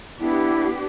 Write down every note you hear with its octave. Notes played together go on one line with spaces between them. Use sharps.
B3 D4 E4 G4